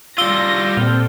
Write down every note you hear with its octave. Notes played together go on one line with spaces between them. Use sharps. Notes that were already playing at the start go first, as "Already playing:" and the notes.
G3 F4 E6 A#6 G7
A#2 C4 A4 F6 G6